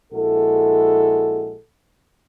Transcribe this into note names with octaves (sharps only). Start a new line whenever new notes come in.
A#1 G#3 E4 F#4 A4